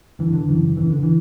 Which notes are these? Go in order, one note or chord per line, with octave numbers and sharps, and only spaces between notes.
G2 D3 E3
D3
F#2 C#3 E3
E2 C#3 E3
D3
E3